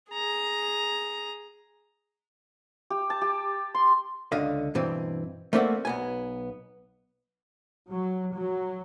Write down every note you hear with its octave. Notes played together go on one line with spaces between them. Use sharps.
G#4 A#5
G4
A5
G4
C6
C#2 D3 D#5 F5
G2 B2 E3 C4
A3 A#3 C4 D5 E5 F#5
B1 B3 G#5
F#3
F#3